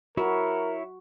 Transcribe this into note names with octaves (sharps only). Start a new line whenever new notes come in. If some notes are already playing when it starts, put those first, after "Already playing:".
E4 F#4 A#4 C#5